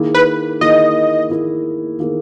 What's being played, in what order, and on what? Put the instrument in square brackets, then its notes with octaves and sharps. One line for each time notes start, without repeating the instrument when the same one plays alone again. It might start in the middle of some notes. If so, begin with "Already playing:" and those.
Already playing: [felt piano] D#3 A#3 E4 G#4
[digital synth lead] B4
[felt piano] D#3 A#3 E4 G#4 [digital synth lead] D#5
[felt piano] D#3 A#3 E4 G#4
D#3 A#3 E4 G#4